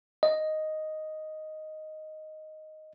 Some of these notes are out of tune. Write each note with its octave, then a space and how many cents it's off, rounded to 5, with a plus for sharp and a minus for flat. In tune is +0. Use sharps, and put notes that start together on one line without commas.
D#5 +0